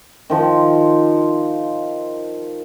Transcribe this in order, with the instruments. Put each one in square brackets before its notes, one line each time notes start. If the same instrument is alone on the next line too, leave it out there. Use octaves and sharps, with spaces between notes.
[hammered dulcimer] D#3 F3